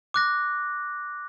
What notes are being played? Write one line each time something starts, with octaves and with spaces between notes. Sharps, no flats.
D6 F#6 A#6